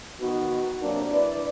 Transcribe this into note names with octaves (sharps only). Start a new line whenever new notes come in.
D#3 B3 D#4 F#4
C3 F#3 A#3 D4
D4 E4 B4 D5